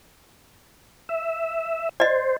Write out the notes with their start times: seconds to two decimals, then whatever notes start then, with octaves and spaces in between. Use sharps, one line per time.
1.09 E5
2.00 C5 D5 D#5